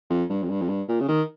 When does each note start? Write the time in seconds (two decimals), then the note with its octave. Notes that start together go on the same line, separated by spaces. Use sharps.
0.10 F2
0.30 G2
0.43 F2
0.50 G2
0.62 F2
0.69 G2
0.89 A#2
1.01 C#3
1.08 D#3